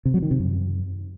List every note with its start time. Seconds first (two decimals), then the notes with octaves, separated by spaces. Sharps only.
0.05 C3
0.14 F#3
0.22 D#3
0.31 C3
0.39 F#2